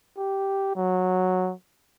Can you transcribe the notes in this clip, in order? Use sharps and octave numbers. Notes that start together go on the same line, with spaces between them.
G4
F#3